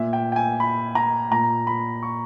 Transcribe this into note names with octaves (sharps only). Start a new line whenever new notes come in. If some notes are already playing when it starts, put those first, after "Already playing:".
Already playing: A#2 E5
G5
G5
G#5
B5
A#5
A#2 A#5
B5
C#6